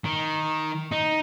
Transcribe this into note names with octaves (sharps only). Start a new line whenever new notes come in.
D#3
D#4